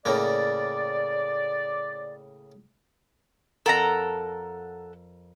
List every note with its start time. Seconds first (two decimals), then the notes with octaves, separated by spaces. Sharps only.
0.05 A2 C#3 A#3 D5
3.66 F2 A4 A#4 F#5 A#5